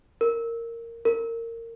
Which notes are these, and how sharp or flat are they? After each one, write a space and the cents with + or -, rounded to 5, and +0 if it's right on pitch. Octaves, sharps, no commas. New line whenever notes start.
A#4 -15
A#4 -25